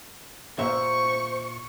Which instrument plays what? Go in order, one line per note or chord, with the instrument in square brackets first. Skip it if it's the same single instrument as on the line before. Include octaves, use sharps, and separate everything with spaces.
[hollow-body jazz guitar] A#2 E5 [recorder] C5 [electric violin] C#6